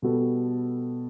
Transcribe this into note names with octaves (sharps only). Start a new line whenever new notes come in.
B2 G3 B3 F#4 A4